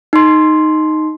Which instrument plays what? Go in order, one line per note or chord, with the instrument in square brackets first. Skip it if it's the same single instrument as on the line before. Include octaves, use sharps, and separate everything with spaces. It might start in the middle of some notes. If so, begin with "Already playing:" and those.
[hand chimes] D#4 C6